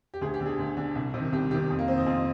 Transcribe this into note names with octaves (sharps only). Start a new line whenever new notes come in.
G4
D2 G#4
G4
D3
G#4
D2
D3
C2
C3 D#3
C2 G4
C3 D#3 G4
F2
A#3
D#3 C4
D#4
F2 F4